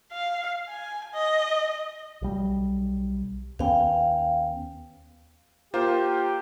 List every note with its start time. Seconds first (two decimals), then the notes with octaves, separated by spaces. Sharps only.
0.12 F5
0.68 G#5
1.14 D#5
2.22 B1 G3
3.59 D#2 B3 C#4 F5 G5
5.74 A#3 F4 G4 C5